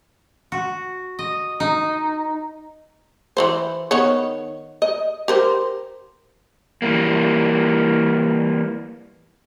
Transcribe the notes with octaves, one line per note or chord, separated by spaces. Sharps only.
F#4
D#5
D#4
E3 A3 C5
D#3 B3 C#5
D#5
G4 A#4 C5
E3 G3 A#3